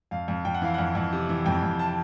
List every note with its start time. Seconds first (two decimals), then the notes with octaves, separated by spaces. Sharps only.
0.11 F2 F5
0.28 F2
0.45 F2 G5
0.54 F#5
0.61 E3 F5
0.74 F2 F#5
0.95 F2
1.12 C3
1.29 E3
1.46 F2 G5
1.62 F2
1.79 A5